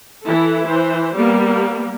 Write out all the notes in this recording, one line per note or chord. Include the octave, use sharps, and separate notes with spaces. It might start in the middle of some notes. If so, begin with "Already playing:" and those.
E3 E4 A4
E3 C5
G3 A#3 B3